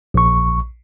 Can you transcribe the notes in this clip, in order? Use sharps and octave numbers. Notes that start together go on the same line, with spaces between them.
A#1 C#6